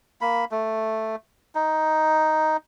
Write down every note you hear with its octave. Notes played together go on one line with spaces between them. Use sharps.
A#3 B5
A3
D#4